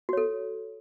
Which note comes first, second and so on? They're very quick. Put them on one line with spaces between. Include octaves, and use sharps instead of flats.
F#4 C#5 A4